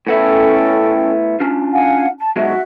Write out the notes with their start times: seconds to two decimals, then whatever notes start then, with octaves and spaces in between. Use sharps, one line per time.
0.07 A2 B3 C#4 E4 A4 G5
1.40 C#4 D4 F4
1.72 F5 F#5 G#5
2.19 A5
2.36 B2 F#3 G#3 F#4 E5